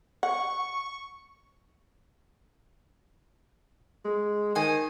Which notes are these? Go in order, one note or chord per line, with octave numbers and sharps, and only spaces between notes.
F#5 C#6
G#3
D#3 C5 G#5